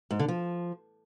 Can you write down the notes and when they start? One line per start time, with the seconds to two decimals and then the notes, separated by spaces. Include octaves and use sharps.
0.11 G#2
0.19 D3
0.28 F3